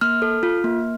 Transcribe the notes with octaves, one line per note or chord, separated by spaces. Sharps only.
A#3 F6
A4
F4
A#3